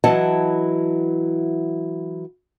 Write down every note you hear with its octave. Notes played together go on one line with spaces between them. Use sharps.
E3 F#3 E4 D#5 F#5 A5